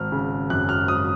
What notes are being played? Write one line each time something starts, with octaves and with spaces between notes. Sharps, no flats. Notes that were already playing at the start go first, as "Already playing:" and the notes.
Already playing: G#1 F6
C#3
F#2 F#6
F6
G#1 D#6